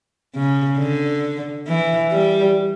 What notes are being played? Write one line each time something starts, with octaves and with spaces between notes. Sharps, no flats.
C#3
D3
E3
G3